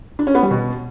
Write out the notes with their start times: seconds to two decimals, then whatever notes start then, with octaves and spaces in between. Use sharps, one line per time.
0.19 D4
0.27 C#4
0.35 B3
0.43 G3
0.51 B2